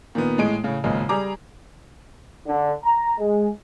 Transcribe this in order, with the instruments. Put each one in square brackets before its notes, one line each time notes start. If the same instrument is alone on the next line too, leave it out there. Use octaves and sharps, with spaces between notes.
[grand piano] A#2 D#3 B3
A2 G#3 D7
A2 C#3
G#1 A#2 C#3 G#3
G3 G#4 A#5 D6
[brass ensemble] D3
A#5
G#3